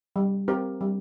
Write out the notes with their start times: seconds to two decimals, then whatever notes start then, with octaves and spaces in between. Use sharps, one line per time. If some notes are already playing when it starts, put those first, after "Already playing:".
0.16 G3
0.48 C4 G4 A#4
0.81 G3